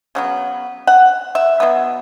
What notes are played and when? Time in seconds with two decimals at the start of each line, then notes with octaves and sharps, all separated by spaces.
0.15 C#3 F#3 B3
0.87 F#5
1.35 E5
1.60 B2 F#3 B3